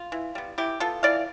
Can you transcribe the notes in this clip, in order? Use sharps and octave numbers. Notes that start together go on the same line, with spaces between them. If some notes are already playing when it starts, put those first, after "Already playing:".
Already playing: F4
E3
G3 B3
E3 E4 G4
B3 F4 A4
E3 D5 F5